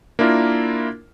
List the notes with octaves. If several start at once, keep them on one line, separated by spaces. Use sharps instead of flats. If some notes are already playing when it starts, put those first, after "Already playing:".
A#3 D4 E4 F4 A#4